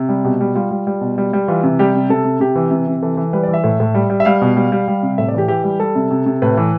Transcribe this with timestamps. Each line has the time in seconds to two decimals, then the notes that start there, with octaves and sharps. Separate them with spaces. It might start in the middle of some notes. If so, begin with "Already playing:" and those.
Already playing: C3
0.09 G3
0.25 B2 G4
0.41 G3
0.55 G3 F4
0.71 G3
0.87 G3
1.01 B2
1.18 G3
1.33 G3
1.48 E3 F4
1.63 C3
1.79 G3 G4
1.95 C3
2.09 C3 A4
2.25 C3
2.40 C3 G4
2.55 E3
2.71 C3
2.87 C3
3.02 E3 A4
3.17 E3
3.33 G3 B4
3.43 D5
3.48 E3
3.54 E5
3.64 A2
3.80 A2
3.94 G3
4.10 G3
4.20 E5
4.25 G3 F5
4.42 B2
4.56 G3
4.72 G3
4.88 G3
5.03 C3
5.18 A2 E5
5.28 D5
5.34 E3 G4
5.48 E3 G4
5.64 G3
5.80 G3 A4
5.95 C3
6.11 C3
6.26 C3
6.42 A2 B4
6.57 E3